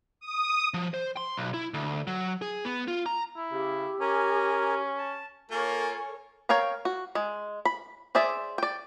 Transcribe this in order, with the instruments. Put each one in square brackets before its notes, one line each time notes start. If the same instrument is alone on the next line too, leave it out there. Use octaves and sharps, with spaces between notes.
[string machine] D#6
[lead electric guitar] F3
C5
C6
B1
E4
D2
F#3
G#4
B3
F4
A#5
[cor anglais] E4
[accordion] C#3 [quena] G4
[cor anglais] C#4 [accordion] A#4 G#5 A#5
[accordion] A5
[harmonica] A#3 [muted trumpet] F4 [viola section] A4 A#4 C#5 [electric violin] G#5 C#6
[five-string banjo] A#4 C#5 F5 G5 A#5
F#4
G#3
B5
G#4 C5 D5 E5
D5 G5